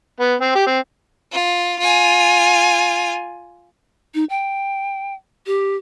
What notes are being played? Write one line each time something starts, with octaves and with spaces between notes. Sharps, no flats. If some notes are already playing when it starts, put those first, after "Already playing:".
B3
C4
G4
C4
F4
F4 G#5
D#4
G5
G4